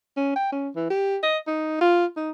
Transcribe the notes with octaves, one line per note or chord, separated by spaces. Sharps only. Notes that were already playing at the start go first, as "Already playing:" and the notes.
C#4
G5
C#4
E3
G4
D#5
D#4
F4
D#4